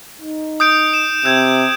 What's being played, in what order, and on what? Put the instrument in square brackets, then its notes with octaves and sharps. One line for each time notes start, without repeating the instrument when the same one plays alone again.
[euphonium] D#4
[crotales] D#6 G6 D7
E7
[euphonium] C3 [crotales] E6 G6 G#6